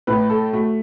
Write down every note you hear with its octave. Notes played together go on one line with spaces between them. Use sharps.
A2 B4
A4
A3 F#4